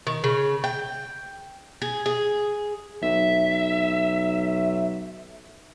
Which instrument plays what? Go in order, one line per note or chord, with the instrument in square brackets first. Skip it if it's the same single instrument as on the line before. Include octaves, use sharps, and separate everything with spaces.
[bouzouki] D#3
C#3
G5
G#4
G#4
[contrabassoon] B1 [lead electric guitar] E5